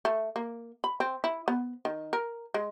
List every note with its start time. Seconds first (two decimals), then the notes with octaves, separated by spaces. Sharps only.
0.05 A3
0.36 A#3
0.84 B5
1.00 C4
1.24 E4
1.48 B3
1.85 D#3
2.13 A#4
2.54 G#3